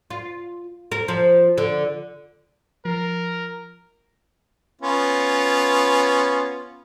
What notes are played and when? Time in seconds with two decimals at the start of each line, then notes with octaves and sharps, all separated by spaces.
0.10 F4
0.92 A#4
1.08 F3
1.58 D3
2.85 F3 A#4
4.82 B3 C#4 F4